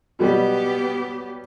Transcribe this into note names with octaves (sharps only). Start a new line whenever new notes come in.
B2 F#3 G3 B3 G4